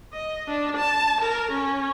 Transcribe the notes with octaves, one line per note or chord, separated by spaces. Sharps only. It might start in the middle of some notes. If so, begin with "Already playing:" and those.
D#5
D4
A5
A#4
C#4